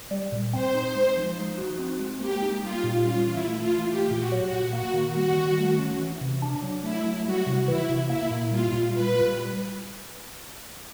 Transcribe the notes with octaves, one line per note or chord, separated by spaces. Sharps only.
G3
A#2
C4 C5
D#4
G#3
F3
D#4
F#4
C4
G#3
A#3 G4
D#4
G3 F4
A#2
C#4 F4
E3
E4
A3
F4
E3
A3 G4
A#2
F#4
F#3
F#4
A#2
A#3 F#4
D#3
G3 F#4
D#3
A3
C#4
E3
C3
D4
F#3
A3 E4
F#3
G3 F#4
C3
E3 E4
C3
A#3 E4
A#2
G3 F4
A#2
F4 B4
G3